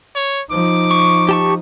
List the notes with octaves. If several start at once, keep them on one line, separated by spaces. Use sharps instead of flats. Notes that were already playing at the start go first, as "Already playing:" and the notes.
C#5
F3 D#4 D6
C#6
G4 A5 C#6